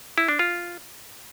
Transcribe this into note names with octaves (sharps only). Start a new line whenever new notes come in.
E4
D4
F4